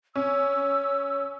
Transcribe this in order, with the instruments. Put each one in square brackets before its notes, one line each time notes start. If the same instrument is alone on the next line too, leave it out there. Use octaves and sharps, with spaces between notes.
[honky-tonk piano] C#4 [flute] E6